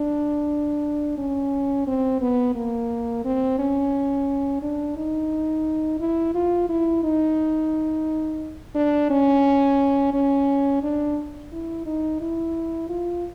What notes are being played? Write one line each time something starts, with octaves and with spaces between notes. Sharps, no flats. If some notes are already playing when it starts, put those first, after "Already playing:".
Already playing: D4
C#4
C4
B3
A#3
C4
C#4
D4
D#4
E4
F4
E4
D#4
D4
C#4
C#4
D4
E4
D#4
E4
F4